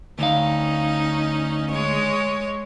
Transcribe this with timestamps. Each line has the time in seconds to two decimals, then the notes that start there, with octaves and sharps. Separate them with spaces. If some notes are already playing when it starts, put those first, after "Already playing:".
0.19 D2 C#4 D#4 F5
1.71 G#3 C#5